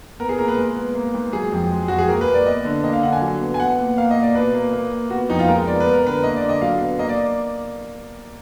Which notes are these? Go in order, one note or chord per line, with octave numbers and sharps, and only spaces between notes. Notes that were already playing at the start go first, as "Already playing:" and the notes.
B3 A#4
G#4
A#2 A#4
B4
G#3
B3
A#3
G#2
F#3 G#4
F2
G#3
F2 F#4
G#4
A#3 A#4
B4
A#2
D5
B3 D#5
D3
A#3 D#5
F5
D3 F#5
G#5
F#3
B3
G#5
B3 F#5
A#2
A#3 F5
D#5
A#2
D5
B2 B4
A#3
A#3
A#2
B3 F#4
F2 D#4
F4
G#3 A#4
B3 D5
B4
B3
A#4
D3 B4
A#3 D#5
D5
D3
D#5
F#3 F5
B3
A#3 D#5
D5